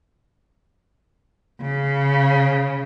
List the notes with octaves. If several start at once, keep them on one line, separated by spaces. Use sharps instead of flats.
C#3